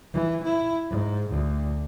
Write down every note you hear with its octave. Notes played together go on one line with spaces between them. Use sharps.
E3
E4
G#2
D2